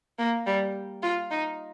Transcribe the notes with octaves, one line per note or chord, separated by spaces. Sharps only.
A#3
G3
F4
D#4